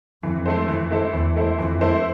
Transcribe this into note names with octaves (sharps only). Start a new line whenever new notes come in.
F2 E3
A3 E4 A4 C5
F2 E3
A3 E4 A4 C5
E2 E3
A3 E4 A4 C5
F2 E3
A3 E4 A4 C5